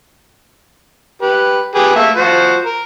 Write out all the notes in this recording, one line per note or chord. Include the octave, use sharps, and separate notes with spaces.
G4 B4
G4 G#4 B4
A3 A#3 E5
F3 F#4 C5
A#4